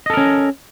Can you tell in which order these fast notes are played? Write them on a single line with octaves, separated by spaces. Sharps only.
D#5 A4 A#4 C#4